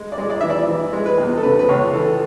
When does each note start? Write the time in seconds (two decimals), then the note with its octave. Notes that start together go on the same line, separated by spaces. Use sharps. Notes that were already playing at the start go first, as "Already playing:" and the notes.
Already playing: G#3
0.12 D5
0.18 G#3
0.30 D5
0.41 E3 E5
0.50 D5
0.69 E3
0.93 G#3
1.06 B4
1.18 E2
1.38 A4
1.43 C#3 B4
1.59 B4
1.69 C#2 C#5
1.94 E3 A4